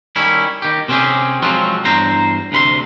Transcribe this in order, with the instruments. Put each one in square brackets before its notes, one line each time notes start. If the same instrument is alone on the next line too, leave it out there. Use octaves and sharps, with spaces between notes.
[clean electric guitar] D#3 G3 C#4 E4
D#3 G4
C3 C4 C#4 F4 G4 G#4
F3 F#3 G#3 C4 F4 F#4
E2 G2 C5 A#5
D2 C3 B5 C6